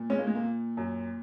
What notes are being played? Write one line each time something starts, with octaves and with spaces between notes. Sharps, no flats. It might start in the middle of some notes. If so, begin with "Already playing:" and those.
Already playing: A#2
G#3 C#4
A#3
G#3
A#3
A#2
F#2